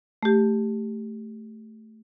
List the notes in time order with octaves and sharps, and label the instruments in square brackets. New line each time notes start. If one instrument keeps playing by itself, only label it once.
[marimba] A3 G4